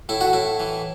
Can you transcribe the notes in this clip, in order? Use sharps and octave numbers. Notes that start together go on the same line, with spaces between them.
A2 E4
F#4
A2 E4
E3